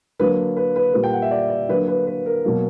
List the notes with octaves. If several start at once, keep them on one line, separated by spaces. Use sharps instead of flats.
D3 F#3 A#3 B4
B4
B4
A#2 G3 A#3 B4
G5
F#5
E5
D5
D5
D3 F#3 A#3 B4
B4
B4
A#4
B2 F#3 A#3